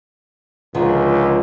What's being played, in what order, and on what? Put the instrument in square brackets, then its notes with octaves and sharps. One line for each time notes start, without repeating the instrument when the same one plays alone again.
[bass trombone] C#2 [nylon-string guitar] D3 D#3 F3